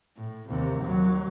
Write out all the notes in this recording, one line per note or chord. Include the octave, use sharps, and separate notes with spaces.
A2
D#2 C3
D#2 F#3